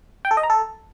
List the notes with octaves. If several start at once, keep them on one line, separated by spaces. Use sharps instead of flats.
G5
A4
D#5
A#5
A4